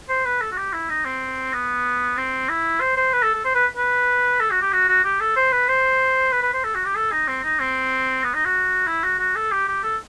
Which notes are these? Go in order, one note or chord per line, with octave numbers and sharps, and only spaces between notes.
C5
B4
A4
F#4
G4
E4
D#4
C4
B3
C4
E4
C5
C5
B4
A4
A4
C5
B4
B4
A4
F#4
G4
F#4
F#4
G4
A4
C5
B4
C5
B4
B4
C5
A4
F#4
G4
A4
D#4
C4
D#4
C4
B3
D#4
F#4
E4
F#4
F#4
A4
G4
G4
A4